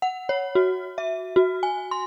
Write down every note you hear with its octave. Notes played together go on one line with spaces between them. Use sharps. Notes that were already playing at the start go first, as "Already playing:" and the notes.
F#5
C#5
F#4
E5
F#4
G#5
C6